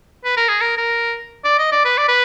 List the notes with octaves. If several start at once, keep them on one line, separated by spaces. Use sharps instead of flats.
B4
A#4
G#4
A#4
A#4
D5
D#5
D5
B4
D5
B4